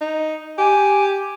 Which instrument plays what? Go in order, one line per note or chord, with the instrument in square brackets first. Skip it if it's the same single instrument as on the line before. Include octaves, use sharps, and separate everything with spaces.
[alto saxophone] D#4
[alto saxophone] G4 [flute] G#5